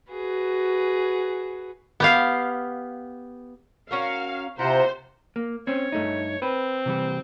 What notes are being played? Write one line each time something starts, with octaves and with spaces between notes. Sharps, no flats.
F#4 G#4 B4
B3 G4 F5
C#4 F#4 A#4 F5
C3 E4 F4 C5 F#5 A#5
A#3
C4 C#4 C#5
G2 A3 D#4
C4 B4
C3 E3 G3